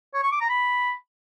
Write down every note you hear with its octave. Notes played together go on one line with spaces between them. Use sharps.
C#5
C#6
D6
A#5
B5